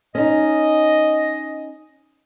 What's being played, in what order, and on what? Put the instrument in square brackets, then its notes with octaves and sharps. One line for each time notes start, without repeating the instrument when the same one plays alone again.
[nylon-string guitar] C#4 D#4 [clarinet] D#5